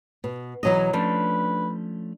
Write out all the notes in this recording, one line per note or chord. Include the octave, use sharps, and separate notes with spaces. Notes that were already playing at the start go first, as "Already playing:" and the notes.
B2
B1 E2 E3 F#3 D#5 A#5
F3 A3 C#4 D4 B4